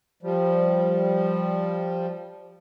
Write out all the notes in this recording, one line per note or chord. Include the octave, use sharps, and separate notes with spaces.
F3 G3